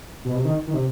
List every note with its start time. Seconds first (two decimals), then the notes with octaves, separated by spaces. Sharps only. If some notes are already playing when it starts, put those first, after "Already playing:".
0.25 B2
0.35 C3
0.45 D#3
0.67 D#3
0.74 C3